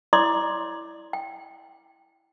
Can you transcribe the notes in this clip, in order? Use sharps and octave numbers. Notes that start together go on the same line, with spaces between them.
E4 C#5 D5 C6 D6 D#6
G5